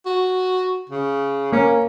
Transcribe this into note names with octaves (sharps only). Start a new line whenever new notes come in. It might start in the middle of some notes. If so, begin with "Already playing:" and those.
F#4
C#3
A#3 C#4